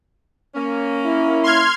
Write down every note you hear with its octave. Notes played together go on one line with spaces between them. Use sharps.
A#3 C#4
E4
C6 F6 G#6